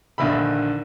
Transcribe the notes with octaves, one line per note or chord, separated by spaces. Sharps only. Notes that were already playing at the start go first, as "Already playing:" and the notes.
A#1 D3 D#3 E5 B5